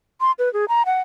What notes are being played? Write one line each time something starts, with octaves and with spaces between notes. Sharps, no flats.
C6
B4
G#4
A#5
F#5